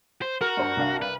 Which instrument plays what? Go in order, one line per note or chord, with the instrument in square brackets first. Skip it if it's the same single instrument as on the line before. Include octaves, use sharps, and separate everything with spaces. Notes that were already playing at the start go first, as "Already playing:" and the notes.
[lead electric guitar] C5
[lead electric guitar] F#4 [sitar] A#4
[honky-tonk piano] G2 C5 A#5
C2 D4 F5
[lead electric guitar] B4